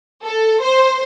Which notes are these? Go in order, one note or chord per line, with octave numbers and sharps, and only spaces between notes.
A4
C5